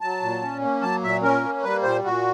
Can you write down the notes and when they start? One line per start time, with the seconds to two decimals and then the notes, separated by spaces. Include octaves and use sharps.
0.01 F#3 A5
0.22 A#2
0.42 C#4
0.61 A#3
0.82 F#3 A5
1.03 A#2 E5
1.22 C#4 A#4
1.43 A#3
1.63 G3 B4
1.83 A#2 C5
2.04 A#2 F#4